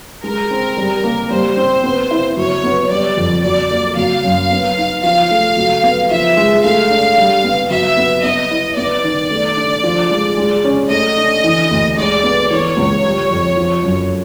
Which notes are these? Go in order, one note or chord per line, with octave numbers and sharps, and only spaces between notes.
G#3 A#4
C4
G3
A#3
G3 C5
C4
B3
E4
F#3 C#5
B3
G3 D5
F2
F#3 D5
A#3
F#3 F5
F#2
B3
D#4
F3 F5
A3
F#3
B3
F3 E5
G#3
A3 F5
D4
G3
B3
F#3 E5
B3
B3 D#5
E4
B3 D5
D#3
A3
D4
F3
G#3
G#3
C#4
A3 D#5
D4
E3
D2
G#3 D5
B3
E3 C#5
C#2
G3
F2
F3
F#2